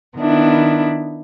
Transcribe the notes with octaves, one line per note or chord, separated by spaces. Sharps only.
D#3 B3 D4 E4